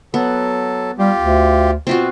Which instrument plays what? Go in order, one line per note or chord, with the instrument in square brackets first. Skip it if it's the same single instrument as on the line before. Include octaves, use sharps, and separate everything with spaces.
[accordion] F#3 A4 [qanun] B3
[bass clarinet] G3 [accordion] F4 G4
[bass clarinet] D2
[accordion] B2 [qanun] C4 F4 F#4